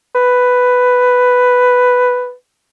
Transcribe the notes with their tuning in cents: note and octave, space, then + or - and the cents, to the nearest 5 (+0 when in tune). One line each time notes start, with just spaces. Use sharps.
B4 +5